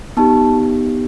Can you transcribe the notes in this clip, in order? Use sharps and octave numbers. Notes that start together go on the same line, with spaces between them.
B3 D#4 G4 A5